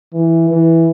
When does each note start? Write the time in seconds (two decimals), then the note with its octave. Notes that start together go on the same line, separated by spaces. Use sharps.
0.13 E3
0.49 E3